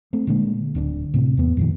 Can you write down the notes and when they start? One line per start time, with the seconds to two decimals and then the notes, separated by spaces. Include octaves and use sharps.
0.13 A3 C4
0.27 A#2 D3 G#3 A#3
0.75 D1 D3 D4
1.14 A2 C3
1.37 E2 A#3 B3
1.57 F2 A#2 D#3